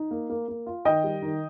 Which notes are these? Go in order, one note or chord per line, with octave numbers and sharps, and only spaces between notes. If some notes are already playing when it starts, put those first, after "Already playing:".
Already playing: D#4
A#3
A#3
A#3
F4
D#3 D#5 G5
G3
D#3